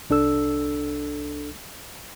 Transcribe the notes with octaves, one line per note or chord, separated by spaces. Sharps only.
C2 D4 A4 E6